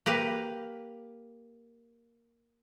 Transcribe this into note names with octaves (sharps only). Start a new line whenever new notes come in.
A#3 G4 B4 F5